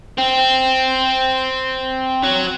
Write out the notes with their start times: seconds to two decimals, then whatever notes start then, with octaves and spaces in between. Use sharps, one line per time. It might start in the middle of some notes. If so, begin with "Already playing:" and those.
0.18 C4
2.24 F#3